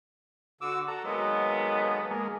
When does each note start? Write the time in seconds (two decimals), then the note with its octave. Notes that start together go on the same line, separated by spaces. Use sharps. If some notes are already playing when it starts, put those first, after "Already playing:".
0.61 D3 F#4 D6 E6
0.88 A4 A#5
1.04 D#3 F#3 G#3 A#3 B3
2.11 G#3 A#3